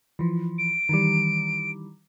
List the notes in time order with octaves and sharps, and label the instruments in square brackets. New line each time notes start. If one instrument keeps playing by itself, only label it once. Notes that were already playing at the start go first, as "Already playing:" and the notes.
[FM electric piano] E3 F3
[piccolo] D7
[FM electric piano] D#3 E3 G3